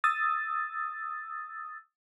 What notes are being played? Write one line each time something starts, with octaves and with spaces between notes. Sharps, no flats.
D#6 E6 A6